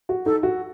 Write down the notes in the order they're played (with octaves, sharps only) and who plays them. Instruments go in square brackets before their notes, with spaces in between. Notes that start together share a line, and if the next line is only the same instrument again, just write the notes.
[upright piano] F#4
[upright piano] D#4 [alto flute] A4
[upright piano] F#4